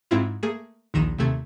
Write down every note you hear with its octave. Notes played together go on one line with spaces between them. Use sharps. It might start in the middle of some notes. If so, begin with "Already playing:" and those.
G#2 C4 E4 F4
A3 A#3 G#4
A#1 D#2 D#3 A#5 D#7 E7
D#2 C3 A3 G#6